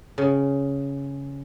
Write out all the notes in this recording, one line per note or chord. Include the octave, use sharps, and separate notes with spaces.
C#3